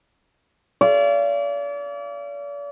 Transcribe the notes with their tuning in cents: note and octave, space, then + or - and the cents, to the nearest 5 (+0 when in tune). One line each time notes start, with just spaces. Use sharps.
D5 -40 F5 -35